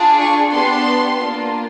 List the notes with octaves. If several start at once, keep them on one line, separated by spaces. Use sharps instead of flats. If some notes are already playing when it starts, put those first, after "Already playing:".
Already playing: D4 F4 G#4
C#6
B3 D4 G4 C6
A#3 D4 F4